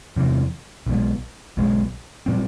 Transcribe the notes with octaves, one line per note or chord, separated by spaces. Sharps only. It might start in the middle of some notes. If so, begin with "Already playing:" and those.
E2 C3 E3
B1 B2 G#3
B1 B2 G#3
A#2 G3 C4